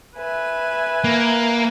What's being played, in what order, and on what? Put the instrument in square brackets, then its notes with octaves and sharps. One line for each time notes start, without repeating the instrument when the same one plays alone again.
[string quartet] B4 E5 G#5
[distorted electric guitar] A#3